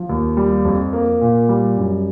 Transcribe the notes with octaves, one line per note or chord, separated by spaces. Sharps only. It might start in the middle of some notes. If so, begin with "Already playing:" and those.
Already playing: F3
D#2
G3
F2
A#3
A#2
G3
F#2